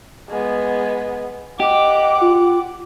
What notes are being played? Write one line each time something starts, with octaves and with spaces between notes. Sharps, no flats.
G#3 B3
G4 D#5 F#5 D6
F4